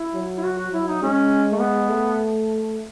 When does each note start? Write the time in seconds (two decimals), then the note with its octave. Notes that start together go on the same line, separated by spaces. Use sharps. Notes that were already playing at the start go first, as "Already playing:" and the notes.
Already playing: E4
0.15 F#3
0.37 E4
0.44 F#4
0.58 F#4
0.72 F#3 E4
0.88 D#4
1.02 G#3 C#4
1.52 A3
1.60 B3
1.89 A3